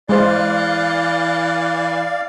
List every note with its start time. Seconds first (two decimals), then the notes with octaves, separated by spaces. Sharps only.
0.09 E3 G#3 C5 D5 F5